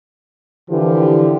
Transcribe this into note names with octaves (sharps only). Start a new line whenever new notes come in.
D3 E3 F3 A#3 G4